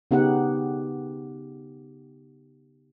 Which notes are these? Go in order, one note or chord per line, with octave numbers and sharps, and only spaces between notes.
C#3 B3 D#4 G4 F#5